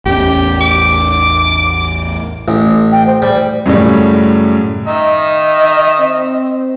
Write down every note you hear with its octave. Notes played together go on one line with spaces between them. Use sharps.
A1 E2 C#4 G4
D6
A1
G5
C5
G3
F#2 A2 C#3 F#3 G3
D#3 D#4 D#5 E5
C4